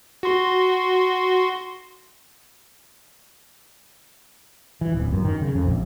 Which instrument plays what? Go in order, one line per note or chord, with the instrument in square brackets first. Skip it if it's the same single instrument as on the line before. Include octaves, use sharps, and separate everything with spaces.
[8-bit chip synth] F#4 C6
[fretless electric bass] E3
D1
F#2
D#3
C#3
F2
A#1